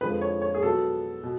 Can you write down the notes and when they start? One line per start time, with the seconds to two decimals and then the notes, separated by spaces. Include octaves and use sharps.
0.01 F2 D3 F3 G#3 B4
0.21 C#5
0.42 C#5
0.54 G#4
0.62 B2 F#3 B3 A4
1.23 B2